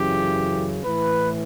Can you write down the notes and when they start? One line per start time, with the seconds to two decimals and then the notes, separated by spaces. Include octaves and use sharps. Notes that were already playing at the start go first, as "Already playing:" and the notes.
Already playing: F#2 C#3 E3 G4
0.84 A2 E3 B4